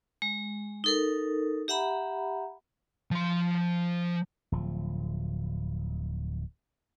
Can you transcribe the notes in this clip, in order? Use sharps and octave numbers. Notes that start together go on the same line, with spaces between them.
G#3
D#4 A4 A#4
G4 E5 F#5 A#5 B5
F3 C6
D1 F3